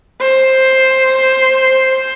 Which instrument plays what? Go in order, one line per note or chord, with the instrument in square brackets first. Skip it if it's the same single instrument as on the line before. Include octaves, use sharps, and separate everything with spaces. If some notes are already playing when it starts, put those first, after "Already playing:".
[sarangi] C5